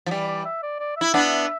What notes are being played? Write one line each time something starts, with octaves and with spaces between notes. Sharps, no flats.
F3
E3 G3 D5
D5
E5
D5
D5
E4 E5
B3 D4